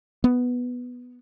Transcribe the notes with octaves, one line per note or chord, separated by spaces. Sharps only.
B3